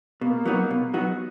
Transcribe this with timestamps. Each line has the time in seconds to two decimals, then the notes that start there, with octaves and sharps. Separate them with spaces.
0.21 B2 A#3
0.45 F#3 B3 D#4 F#4
0.70 B2
0.94 F#3 B3 D#4 F#4